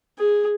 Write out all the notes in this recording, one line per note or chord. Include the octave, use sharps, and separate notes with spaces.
G#4